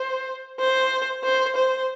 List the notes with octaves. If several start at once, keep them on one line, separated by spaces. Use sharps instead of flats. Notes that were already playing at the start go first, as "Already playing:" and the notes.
Already playing: C5
C5
C5
C5